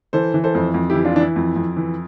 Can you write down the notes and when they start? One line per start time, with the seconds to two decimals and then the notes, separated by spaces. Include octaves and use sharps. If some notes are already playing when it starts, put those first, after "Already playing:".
0.13 E3 A4 C5
0.34 E3
0.44 A4 C5
0.55 F2
0.74 F2
0.90 E3 E4 G4
1.05 D4 F4
1.15 E3 D4
1.21 E4
1.36 F2
1.56 F2
1.77 E3